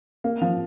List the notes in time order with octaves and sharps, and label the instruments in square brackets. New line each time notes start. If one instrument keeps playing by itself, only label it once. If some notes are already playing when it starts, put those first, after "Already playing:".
[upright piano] A#3
F3